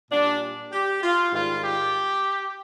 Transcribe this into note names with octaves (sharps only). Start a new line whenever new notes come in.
A#2 G3 D4
G4
F4
G#2 D#3 G3 F4
G4